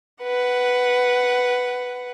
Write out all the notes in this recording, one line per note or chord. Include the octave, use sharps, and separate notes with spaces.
B4 F#5